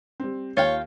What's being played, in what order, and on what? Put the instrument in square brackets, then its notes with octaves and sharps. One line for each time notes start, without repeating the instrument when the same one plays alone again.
[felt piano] G3 C4
[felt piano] D#2 [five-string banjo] F4 F5 G5 [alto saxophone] C#5